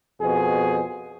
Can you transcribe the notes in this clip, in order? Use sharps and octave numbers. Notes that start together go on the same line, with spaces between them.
F2 B2 G#4